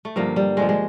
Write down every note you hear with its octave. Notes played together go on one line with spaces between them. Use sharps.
A3
G2 D3 F3 A#3
G3
G2 D3 F3 G#3
G#3